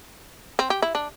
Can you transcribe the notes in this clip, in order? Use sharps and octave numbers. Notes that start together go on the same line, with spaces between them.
C4
G4
E4
D4